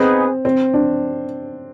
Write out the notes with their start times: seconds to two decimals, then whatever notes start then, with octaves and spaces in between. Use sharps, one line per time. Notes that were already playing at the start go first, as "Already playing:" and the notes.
Already playing: B3 C4 D#4 G#4 B4
0.45 C4
0.74 D4